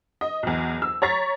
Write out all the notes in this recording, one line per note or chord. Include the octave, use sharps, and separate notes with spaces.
D#5
B1 E2
E6
C#5 A#5 C#6 A6 B6